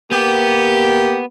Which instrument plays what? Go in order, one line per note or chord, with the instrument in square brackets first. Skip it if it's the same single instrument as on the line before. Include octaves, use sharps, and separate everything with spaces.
[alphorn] A#3 [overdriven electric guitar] B3 [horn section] G4